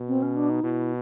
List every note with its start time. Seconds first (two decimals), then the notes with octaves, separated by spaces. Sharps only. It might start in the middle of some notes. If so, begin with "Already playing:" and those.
Already playing: B2
0.08 C4
0.22 C#4
0.36 D4
0.50 D#4
0.63 B2 E4